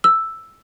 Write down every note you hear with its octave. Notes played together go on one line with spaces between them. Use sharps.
E6